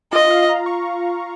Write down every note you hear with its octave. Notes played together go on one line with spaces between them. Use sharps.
F4 D#5
F5
A#5
C#6